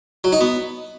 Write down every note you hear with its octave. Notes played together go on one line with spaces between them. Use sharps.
F#3
D#4
B3